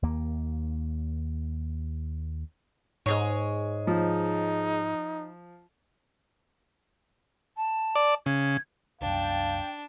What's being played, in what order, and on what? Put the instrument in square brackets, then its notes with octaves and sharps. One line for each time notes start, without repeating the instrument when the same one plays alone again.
[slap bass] D#2 A#3
[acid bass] G#2 [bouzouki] G#3 G#4 C#5
[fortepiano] F3 [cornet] D#4
[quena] A5
[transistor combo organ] D5
[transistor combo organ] C#3 [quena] G#6
[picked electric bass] C2 F#2 [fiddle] D4 [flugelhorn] F5 [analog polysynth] G5 A5